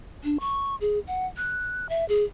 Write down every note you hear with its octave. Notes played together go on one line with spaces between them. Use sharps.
D4
C#6
G#4
F#5
F#6
E5
G#4